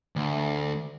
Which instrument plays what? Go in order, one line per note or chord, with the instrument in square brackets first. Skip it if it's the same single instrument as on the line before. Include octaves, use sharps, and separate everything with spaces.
[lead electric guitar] D2